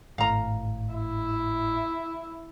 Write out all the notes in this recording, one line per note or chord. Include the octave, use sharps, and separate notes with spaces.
G#1 A2 F5 A#5
E4